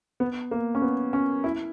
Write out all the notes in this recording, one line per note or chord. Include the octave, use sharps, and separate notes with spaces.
B3
A#3
C#4
B3
C#4
E4